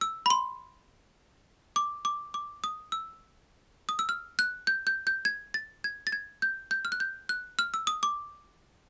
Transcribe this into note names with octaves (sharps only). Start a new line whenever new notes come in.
E6
B5
C6
D6
D6
D6
D#6
E6
D#6
E6
F6
F#6
G6
G6
G6
G#6
A6
G#6
A6
G#6
G6
G6
F6
F#6
G6
F#6
F6
E6
D#6
D6